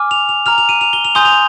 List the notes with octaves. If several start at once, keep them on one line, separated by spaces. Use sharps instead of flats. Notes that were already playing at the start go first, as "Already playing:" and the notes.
Already playing: G#5 D6 F6
F7
F7
A#5 F6 F7
F7
D#7
F7
G7
F7
G#5 C6 D#6 G6 G7
F7